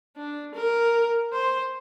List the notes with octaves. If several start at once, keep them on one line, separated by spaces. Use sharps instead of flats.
D4
A#4
C5